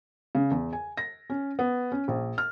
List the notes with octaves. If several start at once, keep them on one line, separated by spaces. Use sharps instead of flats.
C#3
E2
G#5
A#6
C#4
B3
C#4
A#1
F6